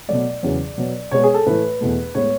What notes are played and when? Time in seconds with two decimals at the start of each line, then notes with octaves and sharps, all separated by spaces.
0.08 B2 F#3 A3 D5
0.42 E2 C#3 F#3 B3
0.78 B2 F#3 B3
1.11 B2 G#3 B3 C#5
1.24 G#4
1.34 A4
1.46 A2 E3 A3 B4
1.81 E2 B2 A3
2.15 A2 G#3 B3 C#5